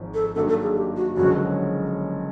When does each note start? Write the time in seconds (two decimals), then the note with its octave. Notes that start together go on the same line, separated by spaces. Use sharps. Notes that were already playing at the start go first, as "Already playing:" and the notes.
Already playing: G#1 G#2 F3
0.14 A4
0.35 G2 D#3 F#3 A#3 D4 A4
0.49 A4
0.62 G#4
0.75 G4
0.96 F#4
1.17 F#1 F#2 D3 F3 G#3 F#4